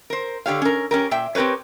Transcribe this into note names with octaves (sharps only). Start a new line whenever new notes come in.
A#4 C5
D3 F#4 G4 C#5 F5
C#4 A#4
C#4 G4 A#4
A#2 E5 G5
C4 G4 A#4 B4 C#5